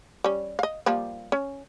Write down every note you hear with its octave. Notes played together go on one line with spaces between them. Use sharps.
G3 C#4
D#5 F5
F3 G3 A#3
C#4